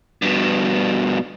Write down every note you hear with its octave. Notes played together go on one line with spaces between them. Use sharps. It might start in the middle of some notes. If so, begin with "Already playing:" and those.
G2 B2